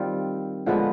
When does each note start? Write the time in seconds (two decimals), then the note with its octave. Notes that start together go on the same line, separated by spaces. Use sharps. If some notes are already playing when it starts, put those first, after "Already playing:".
Already playing: D#3 G3 C4 F4
0.66 D3 F3 G#3 B3